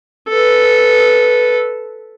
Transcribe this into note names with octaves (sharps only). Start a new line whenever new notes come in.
A4 B4